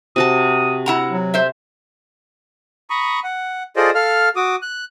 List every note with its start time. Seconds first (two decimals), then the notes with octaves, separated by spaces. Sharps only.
0.16 C3 F#4 A5 D#6
0.86 E4 F#5 A#5
1.09 F#3
1.34 C5 E5
2.90 A#5 B5 C#6 D#6
3.24 F#5
3.76 F4 G#4 A4 C5 D5 D#5
3.95 A4 F5 F6
4.36 F#4 D6 D#6
4.62 F#6